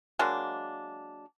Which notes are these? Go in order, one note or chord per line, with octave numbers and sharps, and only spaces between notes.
F#3 G#3 A#3 D4